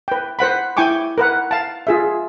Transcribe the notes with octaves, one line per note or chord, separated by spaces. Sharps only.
B4 G5
B4 C5 F#5 B5
E4 G5 G#5 C#6 D6
A#4 B4 F#5
F5 A5
F4 G#4 E5